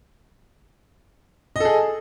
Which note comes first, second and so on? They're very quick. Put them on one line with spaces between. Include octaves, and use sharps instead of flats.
D#5 A4 G#4